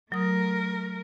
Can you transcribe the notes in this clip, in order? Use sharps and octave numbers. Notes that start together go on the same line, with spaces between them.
F#3 A3 A#4 D#6